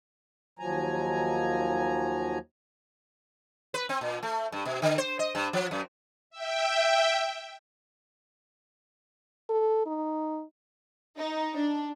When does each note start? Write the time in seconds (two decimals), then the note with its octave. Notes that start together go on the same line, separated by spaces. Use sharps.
0.59 D#2 F3 F#3 G#5 A#5
3.74 B4
3.89 C4
4.01 A#2
4.23 A3
4.52 G2
4.65 B2
4.82 D3
4.98 C5
5.19 D#5
5.35 G2
5.53 F3
5.71 F#2
6.30 E5 G5
9.49 A4
9.86 D#4
11.18 D#4
11.56 D4